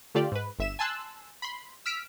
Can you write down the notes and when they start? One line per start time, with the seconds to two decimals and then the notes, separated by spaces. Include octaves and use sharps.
0.15 D3 A3 F4 G4 D5
0.32 G#2 B4
0.59 G1 E5 E7
0.79 G#5 A5 C6 E6 F#6
1.42 B5 C6
1.86 E6 F6 B6 D7